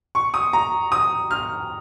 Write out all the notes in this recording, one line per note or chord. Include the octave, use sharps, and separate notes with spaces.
C#6
D#6
A#5
D#6
F6